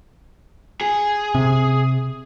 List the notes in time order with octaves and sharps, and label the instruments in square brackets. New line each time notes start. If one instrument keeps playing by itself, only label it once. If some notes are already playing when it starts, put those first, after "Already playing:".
[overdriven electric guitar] G#4
[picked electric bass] C3